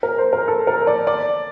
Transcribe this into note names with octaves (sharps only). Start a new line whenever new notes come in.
A#4
C5
A#4
A4
A#4
D5
D5